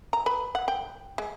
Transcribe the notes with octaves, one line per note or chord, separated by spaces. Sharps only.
A#5
B4 B5
F#5
G5
G#3